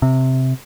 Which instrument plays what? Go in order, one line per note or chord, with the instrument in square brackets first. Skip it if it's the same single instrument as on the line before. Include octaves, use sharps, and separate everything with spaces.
[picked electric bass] C3